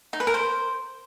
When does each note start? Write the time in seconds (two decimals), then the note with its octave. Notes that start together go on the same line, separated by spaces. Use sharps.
0.13 D#4
0.20 B4
0.27 A#4
0.34 C5